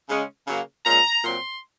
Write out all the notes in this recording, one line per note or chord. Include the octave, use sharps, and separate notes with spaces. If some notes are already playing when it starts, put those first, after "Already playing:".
C#3 G#3 C#4
C#3 F#3 A#3
A#2 G#3 C#4 A#5
A#2 F#3 C4 C6